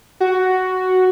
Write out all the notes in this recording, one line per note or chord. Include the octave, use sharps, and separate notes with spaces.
F#4